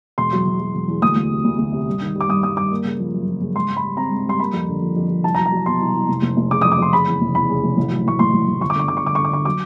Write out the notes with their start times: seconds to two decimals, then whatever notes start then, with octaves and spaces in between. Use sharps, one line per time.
0.18 E1 C6
0.33 F#3
0.47 E1
0.60 F#3
0.75 E1
0.88 E2
1.02 D2 D#6
1.16 D2
1.31 C3
1.44 D2
1.58 D2
1.72 C3
1.87 G2
2.01 D#3
2.15 G3
2.21 D6
2.28 G2 D#6
2.43 G2 D#6
2.57 G2 D6
2.71 A#3
2.85 C#3
3.00 F3
3.14 F#2
3.27 F3
3.41 C#3
3.55 G#2 C6
3.70 G#2
3.77 B5
3.83 G3
3.97 C4 A#5
4.11 G#2
4.26 G3 C6
4.39 A#3 B5
4.53 F2
4.68 D3
4.82 F3
4.96 F2
5.09 F2
5.24 C2 A5
5.35 A#5
5.39 F#3
5.46 A#5
5.52 F#3
5.66 B2 C6
5.80 C2
5.94 C2
6.08 F1
6.22 F1
6.37 F1
6.51 C#3 D6
6.61 F2 D#6
6.72 D6
6.78 F2 C6
6.93 C#3 B5
7.07 E2
7.21 F1
7.34 E2 B5
7.49 C#3
7.63 F1
7.77 A1
7.91 F#3
8.06 A2 C#6
8.19 A1 C6
8.34 A1
8.47 A1
8.61 G1 C#6
8.70 D6
8.75 D3 C#6
8.88 G1 D6
8.97 C#6
9.04 G1 D6
9.15 D3 C#6
9.25 D6
9.31 D3 C#6
9.45 F#3 D6